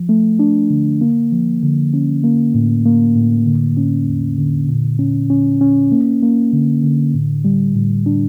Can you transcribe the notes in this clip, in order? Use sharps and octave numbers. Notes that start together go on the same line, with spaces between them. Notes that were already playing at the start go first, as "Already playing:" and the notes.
Already playing: F3
A3
D4
D3
A#3
F3
D3
C#4
A#3
A2
A#3
A2
D3
C#4
E2
D3
A#2
C#4
C#4
C#4
A#3
A#3
D3
D3
A2
G3
A2
D4